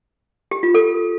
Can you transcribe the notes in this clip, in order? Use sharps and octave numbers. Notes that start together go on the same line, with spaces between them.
G4
F4
A4